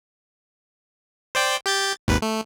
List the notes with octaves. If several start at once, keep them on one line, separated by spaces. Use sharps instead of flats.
C5 D5 G5
G4 G6 A6
G#1 D#2 B4
A3